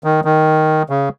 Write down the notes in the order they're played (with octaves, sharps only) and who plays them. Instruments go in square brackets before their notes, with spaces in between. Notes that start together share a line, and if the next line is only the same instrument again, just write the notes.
[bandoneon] D#3
D#3
C#3